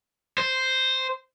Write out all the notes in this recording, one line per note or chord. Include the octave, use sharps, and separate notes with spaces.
C5